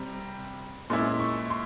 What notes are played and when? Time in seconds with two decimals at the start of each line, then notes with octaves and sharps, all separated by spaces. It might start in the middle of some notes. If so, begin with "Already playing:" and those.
Already playing: C3 G3 C4 A#5
0.90 A#2 G#3 C#4 E4 C6
1.20 C#6
1.50 C6